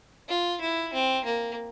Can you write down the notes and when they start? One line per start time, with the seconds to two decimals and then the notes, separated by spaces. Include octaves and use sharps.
0.28 F4
0.61 E4
0.93 C4
1.25 A#3